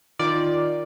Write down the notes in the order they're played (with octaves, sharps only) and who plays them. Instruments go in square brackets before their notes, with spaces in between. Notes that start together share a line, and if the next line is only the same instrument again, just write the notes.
[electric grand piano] D#3 F4 [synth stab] D5